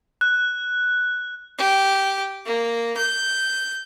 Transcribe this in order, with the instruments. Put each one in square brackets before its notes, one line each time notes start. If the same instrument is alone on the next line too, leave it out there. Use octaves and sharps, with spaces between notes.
[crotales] F#6
[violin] G4
A#3
G6